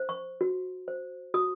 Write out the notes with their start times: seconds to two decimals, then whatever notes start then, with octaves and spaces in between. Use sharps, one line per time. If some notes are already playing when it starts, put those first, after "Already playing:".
Already playing: C5
0.09 C#6
0.41 F#4
0.88 C5
1.34 F#4 D#6